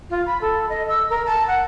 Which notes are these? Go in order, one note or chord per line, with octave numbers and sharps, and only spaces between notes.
F4
B5
A4
D#5
E6
A#4
A5
F#5